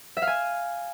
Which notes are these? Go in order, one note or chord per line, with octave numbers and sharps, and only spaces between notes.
E5
F5
G#5